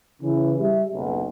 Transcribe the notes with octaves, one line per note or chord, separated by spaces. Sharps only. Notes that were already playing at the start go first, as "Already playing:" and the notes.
C#3 E3
G3 G4 G#4 E5
F#1 B1